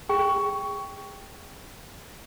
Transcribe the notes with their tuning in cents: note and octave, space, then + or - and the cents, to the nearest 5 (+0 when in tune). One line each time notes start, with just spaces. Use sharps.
G#4 -25 G5 +0